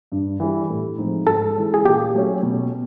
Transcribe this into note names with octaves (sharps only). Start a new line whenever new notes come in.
G2
E3 G3
A2
F3 G#3 C4 D#4
G#2 A4
E3 G#3 C#4 E4
G#4
A#2 G4
F#3 A3 C#4
B2